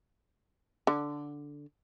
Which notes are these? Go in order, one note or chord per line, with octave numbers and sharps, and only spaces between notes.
D3